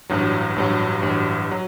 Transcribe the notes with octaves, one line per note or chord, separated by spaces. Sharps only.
A1 G2 F#3
A1 G2 F#3
A1 G2 F#3
F#3